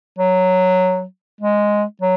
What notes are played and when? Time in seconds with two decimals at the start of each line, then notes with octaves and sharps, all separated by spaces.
0.18 F#3
1.41 G#3
2.01 F#3